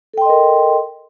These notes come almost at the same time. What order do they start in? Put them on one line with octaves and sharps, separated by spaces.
A4 G5 C6 D#5 A#4